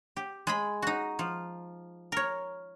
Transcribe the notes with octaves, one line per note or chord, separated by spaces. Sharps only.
G4
G#3 G#4 B5
D#4 F#4
F3
A#4 C#5